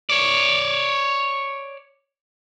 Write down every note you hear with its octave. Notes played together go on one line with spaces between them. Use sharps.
C#5 D5